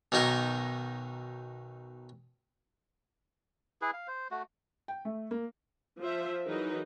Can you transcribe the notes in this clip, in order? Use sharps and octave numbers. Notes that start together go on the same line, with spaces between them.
B1 D#3 F#3 D#4 A#4
E4 G#4 B4
F5
C5
A3 F#4
G5
A3
A#3
F3 F4 C5 E5
E3 F#3 D#4 G#4 A#4 B4